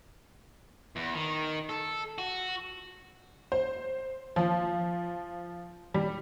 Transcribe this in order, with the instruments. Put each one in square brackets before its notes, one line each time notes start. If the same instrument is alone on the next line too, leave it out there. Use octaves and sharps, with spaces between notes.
[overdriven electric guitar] E2
D#3
A4
F#4
[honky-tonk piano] C5
F3
G3